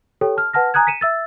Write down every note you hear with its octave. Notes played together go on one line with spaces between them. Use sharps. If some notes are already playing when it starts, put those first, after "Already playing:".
G4 A4 C#5 G5
A5 F6
B4 F#5 A5 F6 A#6
G#5 A#5 D#6 F#6 G#6
B6 C#7 D#7 E7
E5 E6 A6